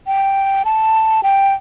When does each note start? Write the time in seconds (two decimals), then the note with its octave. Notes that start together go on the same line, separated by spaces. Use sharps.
0.07 G5
0.65 A5
1.23 G5